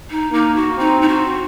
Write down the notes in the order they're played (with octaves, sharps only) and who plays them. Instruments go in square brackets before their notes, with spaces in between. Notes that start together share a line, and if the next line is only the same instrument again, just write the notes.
[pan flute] D#4
[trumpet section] A#3 [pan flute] D#4
[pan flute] F#4
[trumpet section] C4 [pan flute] D#4
[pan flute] D#4
F#4